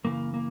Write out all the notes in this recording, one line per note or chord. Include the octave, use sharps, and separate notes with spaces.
F#2 C#3 E3 A#3
A#3